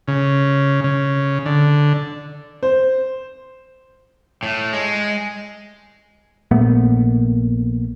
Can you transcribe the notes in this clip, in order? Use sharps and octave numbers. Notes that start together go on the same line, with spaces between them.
C#3
C#3
D3
C5
A2
G#3
A#1 A#2 A3 B3